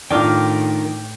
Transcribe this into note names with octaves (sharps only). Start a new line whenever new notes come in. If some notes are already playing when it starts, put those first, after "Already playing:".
A2 D#3 D4 F4 G5 D6 F6